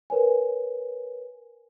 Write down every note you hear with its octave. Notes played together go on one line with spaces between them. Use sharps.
A#4 B4 C#5 G#5